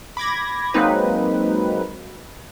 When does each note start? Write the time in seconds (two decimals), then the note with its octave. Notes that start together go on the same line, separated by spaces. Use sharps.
0.17 B5 D6 G#6 A#6
0.74 F#3 G#3 A#3 C4 D#4 B4